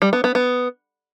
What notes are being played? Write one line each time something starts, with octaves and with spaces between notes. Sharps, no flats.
G3
B3
B3
B3